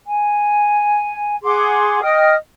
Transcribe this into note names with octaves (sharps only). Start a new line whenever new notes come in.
G#5
G#4 F#5 C6 D6
D#5 G5 D#6 F6